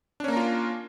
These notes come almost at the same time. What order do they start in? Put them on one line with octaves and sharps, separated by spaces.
D4 C#4 A#3 A#4 F4